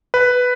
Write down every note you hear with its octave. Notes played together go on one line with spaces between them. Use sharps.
B4